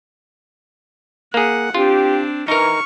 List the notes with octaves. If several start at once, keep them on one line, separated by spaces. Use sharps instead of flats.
A#3 G#4 F#5
C4 D4 F4 G4
E3 D#4 A#4 C#6 F6